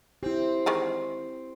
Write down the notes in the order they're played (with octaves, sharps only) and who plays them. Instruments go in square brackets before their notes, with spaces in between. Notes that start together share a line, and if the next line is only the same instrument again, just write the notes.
[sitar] C4 [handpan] E4 G4
[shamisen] D#3 E3 G#3